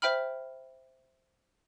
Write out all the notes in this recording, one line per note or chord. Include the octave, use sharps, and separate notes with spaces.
C5 E5 G5 B5 F6